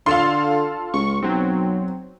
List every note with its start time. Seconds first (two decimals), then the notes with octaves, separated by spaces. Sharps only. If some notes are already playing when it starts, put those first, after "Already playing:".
0.06 D3 F4 A4 F5 A5 C6
0.94 C#2 C#6
1.22 B1 F#3 C4